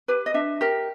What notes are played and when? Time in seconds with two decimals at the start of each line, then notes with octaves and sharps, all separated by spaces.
0.08 G4 B4
0.26 D#5
0.34 D4 E5
0.61 G4 A#4